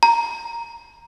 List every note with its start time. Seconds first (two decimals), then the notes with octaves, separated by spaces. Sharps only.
0.03 A#5